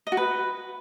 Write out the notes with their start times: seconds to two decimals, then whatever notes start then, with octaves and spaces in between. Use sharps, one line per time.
0.07 D#5
0.12 F#4
0.17 B4